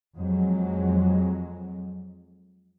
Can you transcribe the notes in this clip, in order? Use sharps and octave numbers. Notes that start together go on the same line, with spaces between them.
F2 F#3 G#3